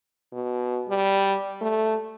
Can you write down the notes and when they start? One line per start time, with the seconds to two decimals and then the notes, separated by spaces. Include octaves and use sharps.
0.33 B2
0.88 G3
1.61 A3